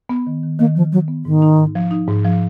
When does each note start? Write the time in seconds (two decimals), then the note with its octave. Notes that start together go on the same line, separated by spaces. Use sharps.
0.09 B3
0.27 D#3
0.43 D#3
0.59 D#3 A#3
0.76 D#3 F3
0.92 D#3 F#3
1.08 B3
1.25 G#2 D#3
1.42 D#4
1.58 G#2
1.75 F3
1.91 D#4
2.07 G#2
2.24 F3